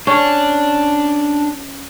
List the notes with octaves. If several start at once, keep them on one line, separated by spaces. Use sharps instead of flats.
C#4 D4